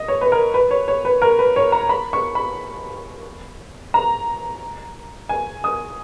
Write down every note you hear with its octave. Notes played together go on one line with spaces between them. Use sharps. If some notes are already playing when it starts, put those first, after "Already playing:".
Already playing: D#5
C#5
B4
A#4
B4
C#5
C#5
B4
A#4
B4
C#5
A#5
B5
C#6
B5
A#5
G#5
D#6